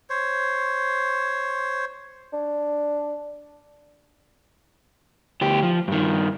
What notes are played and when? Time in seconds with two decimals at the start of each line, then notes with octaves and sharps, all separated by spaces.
0.10 C5 C#5
2.33 D4
5.41 D2 G4
5.63 F3
5.88 G2 D#3